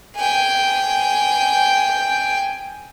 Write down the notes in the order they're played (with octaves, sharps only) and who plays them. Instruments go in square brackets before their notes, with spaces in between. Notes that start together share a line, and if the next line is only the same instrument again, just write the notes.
[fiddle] G5 G#5